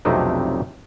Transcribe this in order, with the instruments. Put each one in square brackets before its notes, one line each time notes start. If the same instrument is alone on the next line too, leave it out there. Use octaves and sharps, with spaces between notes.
[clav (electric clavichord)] B1 F2 C3 A3 D4 D#4